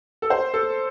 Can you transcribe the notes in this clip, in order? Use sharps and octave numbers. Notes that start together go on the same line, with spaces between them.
A4
C5
A4